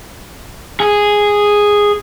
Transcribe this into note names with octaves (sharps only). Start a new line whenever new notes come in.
G#4